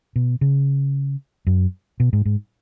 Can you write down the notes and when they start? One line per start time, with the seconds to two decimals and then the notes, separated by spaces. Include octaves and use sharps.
0.16 B2
0.41 C#3
1.47 F#2
2.00 B2
2.13 G#2
2.25 G#2